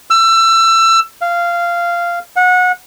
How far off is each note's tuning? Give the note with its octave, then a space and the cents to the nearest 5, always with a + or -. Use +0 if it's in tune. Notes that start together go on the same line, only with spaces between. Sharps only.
E6 +25
F5 -15
F#5 -25